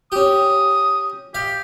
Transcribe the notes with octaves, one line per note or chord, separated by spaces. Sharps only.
C#4 G4 D#6
G4 F5